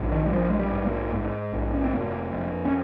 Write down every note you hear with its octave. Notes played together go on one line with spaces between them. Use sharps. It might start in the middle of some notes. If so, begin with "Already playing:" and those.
Already playing: A#1 G#2
D#3
G3
A#1 F3
G#3
G3
G#2
A#3
G#2
A#1
C#4
C4
F1 A#3
F2
C#4